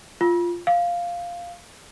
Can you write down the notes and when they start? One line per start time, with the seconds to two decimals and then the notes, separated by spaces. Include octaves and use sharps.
0.21 F4
0.67 F5